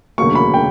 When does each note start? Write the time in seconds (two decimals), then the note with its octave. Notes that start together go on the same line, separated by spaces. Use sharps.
0.18 E1 D2 C#3 F#3 A#3 C#6
0.35 B5
0.54 G5